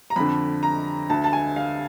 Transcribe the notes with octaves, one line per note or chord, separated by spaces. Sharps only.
A#5
F2 D3 B5
A#5
D2 D3 A5
A5
G#5
F5